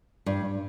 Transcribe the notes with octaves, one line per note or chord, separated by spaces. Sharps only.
G2